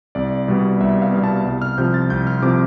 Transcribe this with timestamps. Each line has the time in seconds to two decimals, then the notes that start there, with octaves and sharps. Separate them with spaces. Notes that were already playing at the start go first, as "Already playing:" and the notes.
0.15 C2 D5
0.48 B2 G3 B3
0.80 C2 E5
1.02 F5
1.12 B2 G3 B3
1.24 A5
1.45 C2
1.62 F6
1.78 C3 F3 G6
1.94 A6
2.10 C2 G6
2.27 F6
2.42 C3 F3 D6